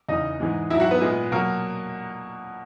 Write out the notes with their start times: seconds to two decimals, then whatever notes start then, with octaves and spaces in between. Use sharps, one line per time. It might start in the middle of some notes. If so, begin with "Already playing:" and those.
0.09 E2 C#3 E3 D#4 D#5
0.40 G#2 E3 G#3
0.70 G#2 F#3 E4 E5
0.80 F#4 F#5
0.91 B3 B4
1.01 A#2 G#3
1.32 B2 F#3 A#3 A#4